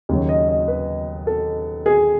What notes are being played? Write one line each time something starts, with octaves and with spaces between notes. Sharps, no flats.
D#2 C#3 F#3
D#5
D#5
B4
A4
G#4